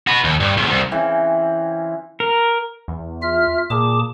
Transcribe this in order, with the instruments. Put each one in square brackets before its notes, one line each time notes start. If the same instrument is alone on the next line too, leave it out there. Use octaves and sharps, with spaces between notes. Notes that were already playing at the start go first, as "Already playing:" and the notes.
[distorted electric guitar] F#4 B4
D#2
G2
B1 E2
C2
[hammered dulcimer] C#3 E3 C4
[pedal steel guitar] A#4
[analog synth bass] E2
[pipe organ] F4 E5 F6
[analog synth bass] A#2 [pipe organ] G#4 A5 D6